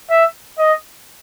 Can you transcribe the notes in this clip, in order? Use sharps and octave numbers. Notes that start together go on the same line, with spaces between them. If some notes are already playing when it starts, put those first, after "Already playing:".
E5
D#5